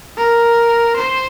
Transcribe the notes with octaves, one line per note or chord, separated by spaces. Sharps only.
A#4
C5